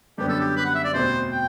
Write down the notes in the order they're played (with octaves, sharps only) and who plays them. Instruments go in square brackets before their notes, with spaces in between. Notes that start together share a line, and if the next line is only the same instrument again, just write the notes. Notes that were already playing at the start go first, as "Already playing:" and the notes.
[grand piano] F#2 D3 G3 B3 D4 [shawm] G4
[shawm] A4
G4
B4
F#5
E5
D5
[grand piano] E2 B2 A3 C4 [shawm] C5
[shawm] G5